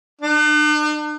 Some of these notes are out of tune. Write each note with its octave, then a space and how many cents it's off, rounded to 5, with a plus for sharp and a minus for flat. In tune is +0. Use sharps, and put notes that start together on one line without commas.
D4 +45